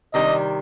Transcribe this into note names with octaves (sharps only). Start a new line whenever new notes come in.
C3 D#3 G3 D4 D#5